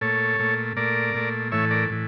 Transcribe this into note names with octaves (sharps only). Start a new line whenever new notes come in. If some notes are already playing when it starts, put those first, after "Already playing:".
A#2 A3 A4 C#5
A#2 A3
A#2 A3 A#4 D5
A#2 A3
A2 E3 A3 C#5 E5
A#4 D5
A2 E3